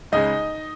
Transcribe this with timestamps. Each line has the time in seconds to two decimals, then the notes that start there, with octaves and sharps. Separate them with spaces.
0.12 C#2 C#3 G#3 D#4 D#5